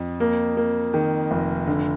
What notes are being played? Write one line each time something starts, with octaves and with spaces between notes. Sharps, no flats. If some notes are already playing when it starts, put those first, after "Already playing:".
Already playing: F2
A#3
A#3
D#3
F1
D3